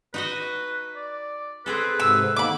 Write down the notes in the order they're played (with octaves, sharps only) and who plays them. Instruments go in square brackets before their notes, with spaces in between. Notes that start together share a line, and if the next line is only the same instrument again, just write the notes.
[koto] D#4 F#4 D#5 [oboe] B4
[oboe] D5
[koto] C4 G#4 A4 [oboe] B4
[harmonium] G#2 C3 [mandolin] E6
[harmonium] D#3 A#3 B3 [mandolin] B5 D6